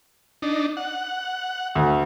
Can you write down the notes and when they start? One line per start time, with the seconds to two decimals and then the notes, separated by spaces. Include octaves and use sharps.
0.42 D4 D#4
0.77 F#5
1.75 D2